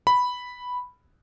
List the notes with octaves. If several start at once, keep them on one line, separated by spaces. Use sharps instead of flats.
B5